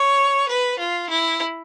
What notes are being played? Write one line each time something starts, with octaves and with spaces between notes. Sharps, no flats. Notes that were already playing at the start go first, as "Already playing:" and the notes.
Already playing: C#5
B4
F4
E4